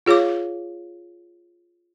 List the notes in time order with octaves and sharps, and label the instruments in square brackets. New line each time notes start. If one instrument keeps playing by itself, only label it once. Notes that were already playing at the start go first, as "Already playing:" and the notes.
[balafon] F4 G#4 C#5 F5 D6